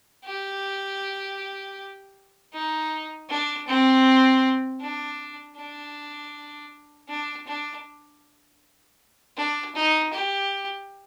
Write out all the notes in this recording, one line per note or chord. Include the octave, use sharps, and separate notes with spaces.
G4
D#4
D4
C4
D4
D4
D4
D4
D4
D#4
G4